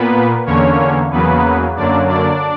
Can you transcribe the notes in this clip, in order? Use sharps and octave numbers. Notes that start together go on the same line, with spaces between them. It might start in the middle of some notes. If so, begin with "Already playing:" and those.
Already playing: A#2 A#3 B3 B4
E2 D3 A#3 C#4 C#5
E2 C#3 F#3 A#3 B3 B4
F#2 D3 F#3 A#3 D4 D5
D4 D5